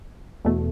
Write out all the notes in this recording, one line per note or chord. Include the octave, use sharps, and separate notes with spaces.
E2 B2 A3